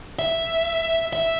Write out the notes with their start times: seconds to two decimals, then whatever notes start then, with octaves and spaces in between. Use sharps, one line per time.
0.19 E5
1.13 E5